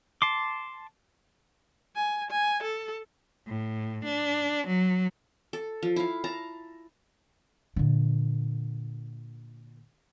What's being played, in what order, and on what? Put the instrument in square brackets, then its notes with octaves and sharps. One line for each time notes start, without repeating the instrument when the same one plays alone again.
[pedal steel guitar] A5 C6 D6
[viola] G#5
G#5
A4
[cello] A2
D4
F#3
[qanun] A4
F3
E4 F5
A5 A#5
[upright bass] A#2 D3